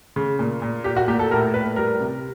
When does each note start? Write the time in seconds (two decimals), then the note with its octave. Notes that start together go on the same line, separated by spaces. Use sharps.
0.16 C#3
0.39 A#2
0.62 A#2
0.84 A#2 G4
0.96 F#4
1.08 A#2 G4
1.19 A4
1.31 A2 A#4
1.54 A2 B4
1.76 G3 A#4
2.00 C3